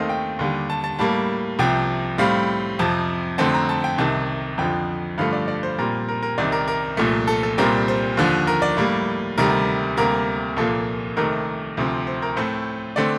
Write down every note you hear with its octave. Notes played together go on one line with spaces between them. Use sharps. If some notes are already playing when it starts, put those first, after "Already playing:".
Already playing: D#2 D#3 A3 C4 D#5 F5
G5
D#2 D3 G3
A5
A5
A2 G3 A#3 A5
C2 C3 F3 G5
A2 G3 C4 F5
F2 C3 F3 A5
F2 D3 A3 C4 A5
A#5
A5
G5
C2 C3 D#3 A5
F2 D3 F3 G5
G2 D3 F3 A3 F5
D5
D5
C5
A#2 G3 C4 A#4
A#4
A#4
C2 C3 D#3 D5
A#4
A#4
C2 A#2 F3 A3
A4
A4
C2 A#2 G3 C4 A#4
C5
D#2 D3 F3
A#4
D5
A2 G3 A#3
D2 C3 D#3 G3 A#4
D2 C3 G3 A#3 A#4
C2 A#2 F3 A#3 A4
C2 C3 D#3 A3 A#4
D2 C3 F3 C4
C5
A#4
A2 A3 C4 C5
D3 A3 C4 D5